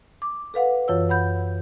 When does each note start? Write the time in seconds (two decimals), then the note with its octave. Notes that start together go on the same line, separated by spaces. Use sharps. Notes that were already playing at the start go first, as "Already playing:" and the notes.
0.22 D6
0.54 A4 B4 F5 F#5
0.88 F#2 E3 F4 C#5 E6
1.09 F#5 B5 G6